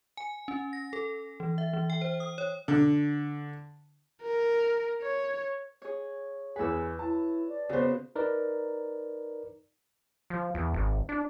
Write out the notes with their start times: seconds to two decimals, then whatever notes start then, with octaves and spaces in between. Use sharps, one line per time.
0.17 G#5
0.48 C#4
0.73 A#6
0.93 A4
1.40 E3
1.58 E5
1.73 E3
1.90 G5
2.01 C5
2.20 D#6
2.38 C#5
2.68 D3
4.22 A#4
5.02 C#5
5.82 G#4 C#5
6.56 E2 G#4 B4 C#5 E6
6.99 E4 A5
7.48 D5
7.69 C#3 B3 F#4 C5
8.15 D#4 A#4 B4 D5
10.30 F3
10.55 E2
10.74 G#1
11.09 D4